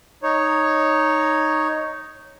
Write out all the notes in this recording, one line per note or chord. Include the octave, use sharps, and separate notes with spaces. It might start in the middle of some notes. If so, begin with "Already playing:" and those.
D#4 C#5